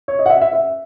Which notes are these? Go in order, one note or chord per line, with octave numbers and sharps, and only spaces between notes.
C#5
D#5
F#5
E5
E5
E5